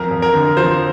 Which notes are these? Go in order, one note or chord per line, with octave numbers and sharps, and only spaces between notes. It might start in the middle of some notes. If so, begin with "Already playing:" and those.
Already playing: F2 A#4
F2
A#4
D3
F3 C5